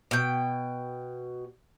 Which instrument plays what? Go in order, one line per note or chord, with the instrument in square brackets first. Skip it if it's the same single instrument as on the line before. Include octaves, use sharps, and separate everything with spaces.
[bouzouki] B2 G5